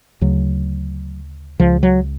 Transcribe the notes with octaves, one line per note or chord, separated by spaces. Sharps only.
D2 C#3 F#3
C#2 C#3 F3
F#3